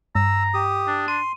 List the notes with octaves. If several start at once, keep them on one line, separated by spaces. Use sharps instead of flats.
G2 A#5 E6
G4 D#6
D4
C6 D#7